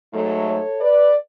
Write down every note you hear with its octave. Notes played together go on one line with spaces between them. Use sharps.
G#2 F#3 A3
A4 C#5
B4 D5